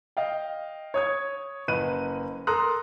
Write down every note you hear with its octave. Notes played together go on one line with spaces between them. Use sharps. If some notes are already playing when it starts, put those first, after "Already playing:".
D#5 F5 G5
C#5 D#6 G#6
F#1 B4 D#5 F#6 D#7
A4 A#4 A#5 C6 D#6 F#6